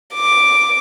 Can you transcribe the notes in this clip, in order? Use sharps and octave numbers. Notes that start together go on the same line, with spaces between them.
D6